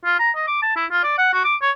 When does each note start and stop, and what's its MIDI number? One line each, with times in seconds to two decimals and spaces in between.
0.05 0.19 65
0.19 0.31 82
0.36 0.45 75
0.47 0.59 86
0.63 0.74 81
0.76 0.86 64
0.91 1.00 65
1.03 1.16 74
1.18 1.29 78
1.33 1.40 66
1.45 1.56 86
1.61 1.71 73